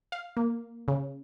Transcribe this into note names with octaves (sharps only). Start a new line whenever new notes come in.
F5
A#3
C#3